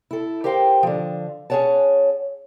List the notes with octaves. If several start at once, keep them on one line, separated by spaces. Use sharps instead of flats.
E4 A4
G4 A#4 C5 F5 G5
D3 F3
C#4 G#4 A#4 C#5 F#5 A5